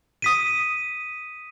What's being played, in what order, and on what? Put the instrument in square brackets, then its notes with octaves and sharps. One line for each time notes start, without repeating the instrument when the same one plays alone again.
[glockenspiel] D#6 B6 D#7